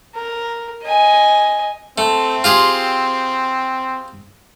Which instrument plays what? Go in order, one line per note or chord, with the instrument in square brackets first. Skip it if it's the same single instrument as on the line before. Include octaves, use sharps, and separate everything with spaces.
[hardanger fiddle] A#4
D#5 G#5
[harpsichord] A3 [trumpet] C4
[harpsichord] F4 G4 G#4